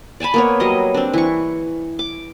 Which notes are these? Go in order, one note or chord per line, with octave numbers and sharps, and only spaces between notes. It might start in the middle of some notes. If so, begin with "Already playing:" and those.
D5 G#5 A5 B5
A#3 B3 C#5
F#3 G3 D#5
C4 D4
E3 C#6
D6